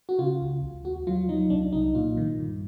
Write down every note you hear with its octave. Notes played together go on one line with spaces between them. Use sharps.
F#4
C#3 F4
C#2
C#2
D#2 F#4
F#3 F4
F#3 D#4
C2 D4
C2 D#4
A#2 F4
D#3
G2